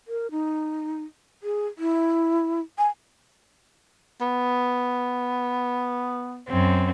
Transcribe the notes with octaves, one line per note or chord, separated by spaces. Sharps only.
A#4
D#4
G#4
E4
G#5
B3
F#2 C4